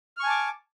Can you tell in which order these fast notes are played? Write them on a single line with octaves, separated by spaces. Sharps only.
F6 C#6 G#5 A5 D6